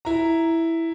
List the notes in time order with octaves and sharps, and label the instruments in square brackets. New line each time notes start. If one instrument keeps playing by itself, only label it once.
[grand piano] E4 A#5